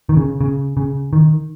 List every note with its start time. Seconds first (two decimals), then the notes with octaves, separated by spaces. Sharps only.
0.09 D#3
0.17 C#3
0.41 C#3
0.77 C#3
1.13 D#3